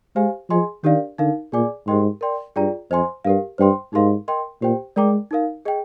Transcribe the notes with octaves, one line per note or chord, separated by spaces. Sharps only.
G#3 G4 C5 F5 G#5
F3 G#4 D#5 G#5 C6
D#3 D4 G4 A#4 D5 F5
D3 D#4 A#4 F5
A#2 G#4 D5 G#5 D6
G#2 G4 A#4 D#5 G5 C6
A#4 D5 G5 C6
G2 F4 G#4 D5 G5 A#5
F2 C5 D#5 G#5 C6
G2 G4 A#4 F5
G2 C5 G5 C6
G#2 D#4 G4 A#4 F5 C6
A#4 D#5 G5 C6
A#2 G4 C5 G5
G#3 A#4 D5 G5 A#5 D6
D#4 A#4 F5
G#4 D#5 G5